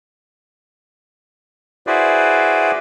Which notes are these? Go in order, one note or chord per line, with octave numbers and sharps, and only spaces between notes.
E4 F#4 G#4 B4 C5 D5